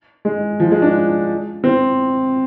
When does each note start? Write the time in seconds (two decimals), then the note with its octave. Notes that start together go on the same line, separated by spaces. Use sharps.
0.25 G#3
0.60 F3
0.71 G#3
0.82 D4
1.64 C4